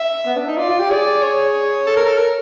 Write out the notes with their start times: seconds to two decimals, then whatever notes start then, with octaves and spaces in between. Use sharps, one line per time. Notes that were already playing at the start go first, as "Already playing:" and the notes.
Already playing: E5
0.26 B3
0.36 D4
0.47 D#4
0.57 F4 D5
0.69 F4
0.79 G4
0.90 G#4 D5
1.22 C#5
1.86 A4
1.96 A#4
2.06 A4
2.17 A#4